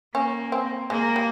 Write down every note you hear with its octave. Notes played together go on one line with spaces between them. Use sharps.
A#3 C#4
C4
G#3 A#3
G3